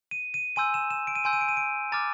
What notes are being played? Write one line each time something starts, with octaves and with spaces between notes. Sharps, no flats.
D#7
D#7
G#5 C6 E6 G6 D#7
E7
E7
D7
D#7
G#5 C6 E6 G6 D7
D#7
D7
D#7
D7
A#5 D6 F6 A6